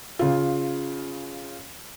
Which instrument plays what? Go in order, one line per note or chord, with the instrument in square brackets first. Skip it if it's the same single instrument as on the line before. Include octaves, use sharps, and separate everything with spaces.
[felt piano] C#3 F4